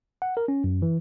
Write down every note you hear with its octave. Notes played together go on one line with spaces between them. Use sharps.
F#5
A#4
C#4
F#2
E3